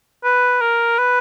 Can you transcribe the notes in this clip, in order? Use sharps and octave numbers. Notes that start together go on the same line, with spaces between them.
B4
A#4
B4